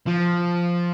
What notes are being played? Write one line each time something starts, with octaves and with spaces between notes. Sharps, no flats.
F3